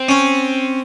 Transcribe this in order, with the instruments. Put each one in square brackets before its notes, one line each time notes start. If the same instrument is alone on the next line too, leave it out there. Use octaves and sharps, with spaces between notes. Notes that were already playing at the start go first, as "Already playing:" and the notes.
Already playing: [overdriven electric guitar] C4
[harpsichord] C#4